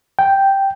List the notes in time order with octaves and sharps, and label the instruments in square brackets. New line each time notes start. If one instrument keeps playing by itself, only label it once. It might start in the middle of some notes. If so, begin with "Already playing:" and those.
[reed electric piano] G5